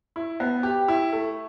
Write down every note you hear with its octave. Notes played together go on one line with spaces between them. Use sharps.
E4
B3
G4
E4
A3